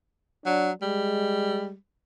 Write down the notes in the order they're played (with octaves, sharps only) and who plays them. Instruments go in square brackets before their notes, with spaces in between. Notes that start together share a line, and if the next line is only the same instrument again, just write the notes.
[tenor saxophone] F#3 [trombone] D4
[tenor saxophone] G3 [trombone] G#3